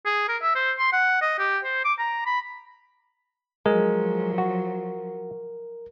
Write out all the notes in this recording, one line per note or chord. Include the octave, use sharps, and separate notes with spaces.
G#4
A#4
E5
C5
C6
F#5
D#5
G4
C5
D6
A#5
B5
F3 F#3 G#3 A#4
F#4